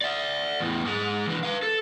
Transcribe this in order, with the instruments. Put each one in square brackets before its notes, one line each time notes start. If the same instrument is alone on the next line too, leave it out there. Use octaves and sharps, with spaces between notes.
[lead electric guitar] D5 E5
E2 A2
G#2 G#3
E3 D4
B4 F5
A4